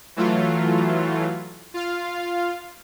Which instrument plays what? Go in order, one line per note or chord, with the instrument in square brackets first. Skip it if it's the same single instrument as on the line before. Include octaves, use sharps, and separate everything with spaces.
[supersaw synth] E3 F#3 A3 F4
F4 F5